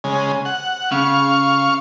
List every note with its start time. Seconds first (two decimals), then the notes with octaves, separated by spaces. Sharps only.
0.04 C#3 G#3
0.45 F#5
0.92 C#3 F5 C#6